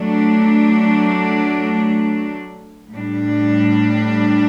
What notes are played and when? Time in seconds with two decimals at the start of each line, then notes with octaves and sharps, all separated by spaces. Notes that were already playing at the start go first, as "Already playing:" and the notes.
Already playing: F#3 A3 D4
2.94 A2 G3 D4